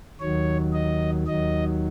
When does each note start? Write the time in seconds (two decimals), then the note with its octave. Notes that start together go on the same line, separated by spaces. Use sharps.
0.20 D#2 D#3 F#3 C#5
0.73 D#5
1.27 D#2 D#3 F#3 D#5